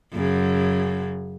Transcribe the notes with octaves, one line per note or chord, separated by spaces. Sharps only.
F#2 C#3